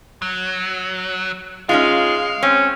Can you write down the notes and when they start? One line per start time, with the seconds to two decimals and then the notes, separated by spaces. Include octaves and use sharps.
0.22 F#3
1.69 G#3 C#4 D#4 F4 F5
2.43 C4 C#4